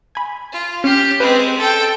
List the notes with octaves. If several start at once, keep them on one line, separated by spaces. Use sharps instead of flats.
G#5 B5
F4
C#4 G4 F6 C7
G#3 C4 B4
A4 G5